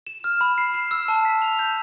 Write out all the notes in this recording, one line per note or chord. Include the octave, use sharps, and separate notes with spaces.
E7
F6
B5
C7
E7
E6
A5
B6
F7
G6